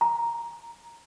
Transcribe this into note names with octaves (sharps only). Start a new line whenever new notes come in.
A#5